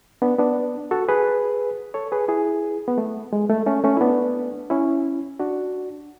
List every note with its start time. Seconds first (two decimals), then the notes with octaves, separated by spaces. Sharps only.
0.22 B3 D4
0.39 B3 D4
0.91 F#4 A4
1.09 G#4 B4
1.94 A4 C#5
2.12 G#4 B4
2.28 E4 G#4
2.88 B3
2.98 A3
3.33 G#3
3.50 A3
3.66 A3 C#4
3.84 A3 C#4
3.97 E4
4.01 B3 D4
4.70 C#4 E4
5.40 D4 F#4